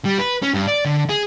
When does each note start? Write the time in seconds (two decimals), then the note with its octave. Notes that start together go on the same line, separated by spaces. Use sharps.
0.05 G3
0.19 B4
0.42 C#4
0.54 G2
0.68 D5
0.85 D3
1.09 G#4